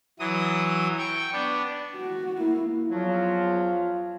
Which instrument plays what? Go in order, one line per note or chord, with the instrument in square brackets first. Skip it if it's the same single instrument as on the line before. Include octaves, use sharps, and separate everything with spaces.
[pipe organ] E3 F#3 D#6
G5 C#6
B3 D4
[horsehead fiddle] F#4
A#3 E4
[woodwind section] E2 F3 F#3 [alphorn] F4